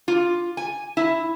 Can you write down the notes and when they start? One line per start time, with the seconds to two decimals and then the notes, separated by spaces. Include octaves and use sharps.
0.08 F4
0.57 G#5
0.97 E4